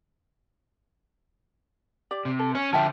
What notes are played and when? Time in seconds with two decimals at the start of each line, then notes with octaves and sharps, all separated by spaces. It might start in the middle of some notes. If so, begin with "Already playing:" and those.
2.11 G4 D5
2.25 C3
2.39 A4
2.55 C#4 C#5
2.73 D3 F3 E5 G5 A5